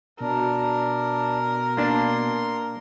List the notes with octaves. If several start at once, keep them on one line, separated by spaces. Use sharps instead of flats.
B2 D4 A#4
A#3 D4 A5 C6